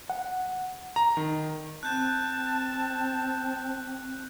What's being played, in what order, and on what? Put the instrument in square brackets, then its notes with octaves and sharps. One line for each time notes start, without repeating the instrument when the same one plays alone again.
[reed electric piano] F#5
[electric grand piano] A#5
D#3
[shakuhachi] C4 [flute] A5 [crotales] F#6 G6